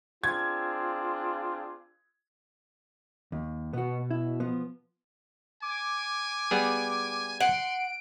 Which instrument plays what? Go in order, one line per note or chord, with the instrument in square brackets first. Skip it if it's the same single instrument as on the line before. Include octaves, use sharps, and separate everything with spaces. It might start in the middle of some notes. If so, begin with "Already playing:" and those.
[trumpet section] C4 D4 G#4 [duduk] F4 [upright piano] G#6
[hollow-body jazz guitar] D#2
[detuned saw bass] B2 [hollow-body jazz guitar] B3 F#4
[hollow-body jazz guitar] E4
F3 B3
[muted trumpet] G#5 [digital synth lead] D6
[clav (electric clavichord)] G3 B3 G#4
[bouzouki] F#5 [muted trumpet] C6 [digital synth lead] D7